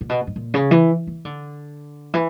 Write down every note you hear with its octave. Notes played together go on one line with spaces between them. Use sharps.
A#2
B2
G2
A#2
C#3
E3
E3
D3
E3